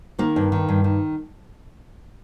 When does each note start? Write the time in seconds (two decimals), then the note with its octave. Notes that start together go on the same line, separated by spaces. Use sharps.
0.19 D#3 A#3
0.36 G2
0.52 D#3
0.69 G2
0.84 D#3